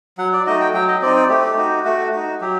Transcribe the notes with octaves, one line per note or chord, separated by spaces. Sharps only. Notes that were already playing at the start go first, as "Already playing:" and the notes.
F#3 F#5
D5
A3 D#4 F#4 D#5
G5
F#3 G5
D#5
C4 D#4 D5
D5
A3 G4
D#4 F#4
A3 F#4
D#4 F#4
F#3 G4